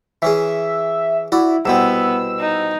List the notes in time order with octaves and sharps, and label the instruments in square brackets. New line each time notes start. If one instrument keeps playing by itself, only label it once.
[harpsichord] E3 C#4 G#4 [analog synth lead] E5
[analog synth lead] E4 [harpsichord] F#4 D5
[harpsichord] C2 B2 C4 [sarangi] B3 [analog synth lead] E6
[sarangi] D#4